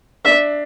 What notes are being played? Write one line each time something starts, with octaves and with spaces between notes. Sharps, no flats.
D4 E5